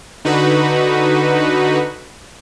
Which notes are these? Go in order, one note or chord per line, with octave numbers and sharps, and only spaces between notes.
D3 D#4 F#4 B4